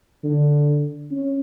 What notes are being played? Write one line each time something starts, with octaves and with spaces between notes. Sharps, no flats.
D3
C#4